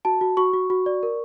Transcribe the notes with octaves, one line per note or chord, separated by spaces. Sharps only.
F#4 A5
F#4
F#4 C#6
F#4
F#4
D5
A#4